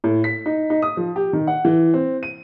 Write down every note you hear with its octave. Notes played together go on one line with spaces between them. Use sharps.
A2
B6
D#4
D#4
D#6
F3
G4
D#3
F#5
E3
C4
D#7